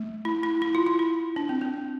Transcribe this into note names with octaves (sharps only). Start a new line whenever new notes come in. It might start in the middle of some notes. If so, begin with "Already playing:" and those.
Already playing: A3
E4
E4
E4
F4
F4
E4
D4
C4
C4